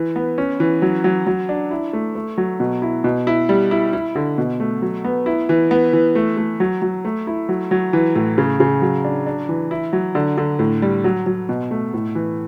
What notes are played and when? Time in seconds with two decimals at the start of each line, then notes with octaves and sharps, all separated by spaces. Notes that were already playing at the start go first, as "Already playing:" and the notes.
Already playing: E3
0.16 B3
0.38 C#4
0.60 E3
0.82 F#3
1.04 F#3
1.27 F#3
1.49 D4
1.71 E4
1.93 A3
2.15 A3
2.38 F#3
2.60 B2
2.82 E4
3.04 B2
3.27 E4
3.49 G3
3.71 E4
3.93 E4
4.16 D3
4.38 B2
4.60 A3
4.82 F#3
5.04 B3
5.26 E4
5.49 E3
5.71 B3
5.93 E3
6.15 A3
6.37 A3
6.60 F#3
6.82 F#3
7.05 A3
7.27 E4
7.49 F#3
7.71 F#3
7.93 E3
8.16 A2
8.38 C#3
8.60 C#3
8.82 F#3
9.04 D4
9.26 D4
9.49 E3
9.71 E4
9.93 F#3
10.15 D3
10.38 D3
10.59 A2
10.82 G3
11.04 F#3
11.26 F#3
11.49 B2
11.71 A3
11.94 A2
12.15 E3